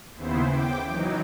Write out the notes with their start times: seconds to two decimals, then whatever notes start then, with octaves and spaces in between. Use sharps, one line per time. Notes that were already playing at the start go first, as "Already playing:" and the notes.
0.16 D#2 C#3 B3 E4 C5
0.49 G5 D6
0.87 E3 F#3 D#4